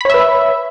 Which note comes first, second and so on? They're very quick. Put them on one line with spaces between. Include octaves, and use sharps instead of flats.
B5 C#5 E5 B4